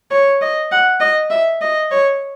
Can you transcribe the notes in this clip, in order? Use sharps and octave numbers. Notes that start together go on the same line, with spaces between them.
C#5
D#5
F#5
D#5
E5
D#5
C#5